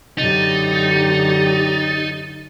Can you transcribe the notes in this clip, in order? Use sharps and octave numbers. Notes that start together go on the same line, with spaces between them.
F#2 D3 D#4 G4 A6